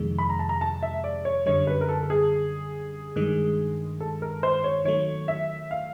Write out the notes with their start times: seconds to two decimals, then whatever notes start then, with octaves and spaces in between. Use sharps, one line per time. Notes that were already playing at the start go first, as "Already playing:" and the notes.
Already playing: F2 C3 D#3 G#3
0.18 B5
0.29 A#5
0.39 A5
0.49 A#5
0.61 A5
0.82 E5
1.04 D5
1.25 C#5
1.46 F#2 D3 G3 C#5
1.67 B4
1.81 A#4
1.89 A4
2.03 A4
2.10 G#4
3.16 G2 D#3 G#3
4.00 A4
4.22 A#4
4.43 C5
4.64 C#5
4.85 D#3 F#3 A3 C#5
5.28 E5
5.71 F5